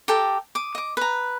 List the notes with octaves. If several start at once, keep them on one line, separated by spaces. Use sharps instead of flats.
G4 A4 G5 A#5
D6 D#6
D#5 D6
B4 A#5